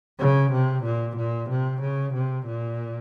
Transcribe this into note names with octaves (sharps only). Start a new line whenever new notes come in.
C#3
C3
A#2
A#2
C3
C#3
C3
A#2